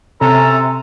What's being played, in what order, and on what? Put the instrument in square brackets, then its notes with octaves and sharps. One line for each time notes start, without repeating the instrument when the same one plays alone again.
[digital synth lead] C3 [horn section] C#4 A4 [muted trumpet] A#5